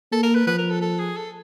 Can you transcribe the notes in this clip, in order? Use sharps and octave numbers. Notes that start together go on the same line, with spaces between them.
A#3 A4
A#4
B4
F3 B4
A#4
A4
A4
G#4
A4